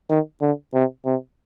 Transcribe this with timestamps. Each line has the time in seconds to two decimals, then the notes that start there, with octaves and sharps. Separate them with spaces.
0.09 D#3
0.41 D3
0.74 C3
1.05 C3